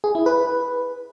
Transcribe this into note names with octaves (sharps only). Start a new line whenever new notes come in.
G#4
E4
B4